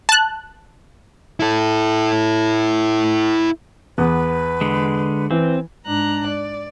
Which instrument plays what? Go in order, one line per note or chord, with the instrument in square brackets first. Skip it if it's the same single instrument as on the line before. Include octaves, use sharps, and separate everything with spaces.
[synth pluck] A5 F#6
[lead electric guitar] E4 A4
[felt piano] E2 B3 [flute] B4
[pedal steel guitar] D3 G#3
[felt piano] E3 [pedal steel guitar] C4
[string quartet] G#2 D4 A#5 F#6
D5